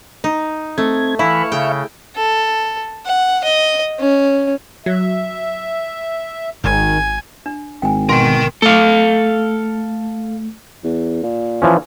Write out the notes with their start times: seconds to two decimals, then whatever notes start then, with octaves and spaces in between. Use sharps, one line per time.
0.24 D#4
0.78 A3 C4 G#6
1.19 E3 E4 E5 F5 B5 C#6
1.52 C#3 G5
2.16 A4
3.06 F#5
3.44 D#5
4.00 C#4
4.86 F#3 E5
6.64 G#1 G#2 D#3 G#5
7.46 D4
7.82 G#1 G5 G#5
8.09 B2 A#4 G5 C6
8.62 A3 A4 F5
10.84 E2
11.23 A#2
11.62 E3 F3 C#4